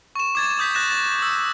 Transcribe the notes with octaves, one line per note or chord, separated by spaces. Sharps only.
C#6 E7
D6 G#6 A6
D#6 G6 B6
F#6 A6 A#6 E7
A6 E7
E6